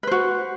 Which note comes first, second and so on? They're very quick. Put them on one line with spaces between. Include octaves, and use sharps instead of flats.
B4 C5 F#4